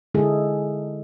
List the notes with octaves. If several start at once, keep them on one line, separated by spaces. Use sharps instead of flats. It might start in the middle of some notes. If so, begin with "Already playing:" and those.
D3 G#3 E4 G#4 A4